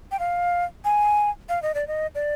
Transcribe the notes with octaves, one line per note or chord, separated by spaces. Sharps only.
G5
F5
G#5
F5
D#5
D5
D#5
D5